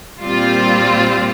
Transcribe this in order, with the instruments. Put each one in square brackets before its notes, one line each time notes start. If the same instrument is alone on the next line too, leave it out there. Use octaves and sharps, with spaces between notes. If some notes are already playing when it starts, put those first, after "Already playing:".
[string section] A#2 G3 C4 F4